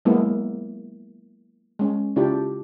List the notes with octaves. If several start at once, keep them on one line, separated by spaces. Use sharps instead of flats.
F#3 G#3 A#3 B3 E4
G#3 C#4
C#3 D4 E4 F4 G4